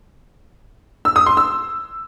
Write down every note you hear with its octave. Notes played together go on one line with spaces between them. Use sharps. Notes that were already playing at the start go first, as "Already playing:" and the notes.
E6
D#6
C6
E6